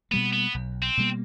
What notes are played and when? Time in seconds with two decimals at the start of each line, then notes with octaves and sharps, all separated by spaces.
0.11 B2 G3 A#3 B3
0.33 B3
0.54 B1
0.82 C4
0.97 B2 G3 A#3